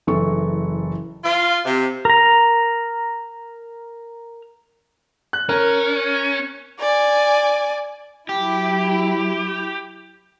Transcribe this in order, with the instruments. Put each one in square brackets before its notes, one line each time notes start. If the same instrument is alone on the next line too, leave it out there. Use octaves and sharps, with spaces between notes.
[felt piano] F#1 E3 A4 C#6
[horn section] F4
C3
[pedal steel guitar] A#4 A#5
[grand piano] F#6
[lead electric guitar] C#4 [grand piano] A#4
[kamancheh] D5 G#5
[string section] F#3 E4 [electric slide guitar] G4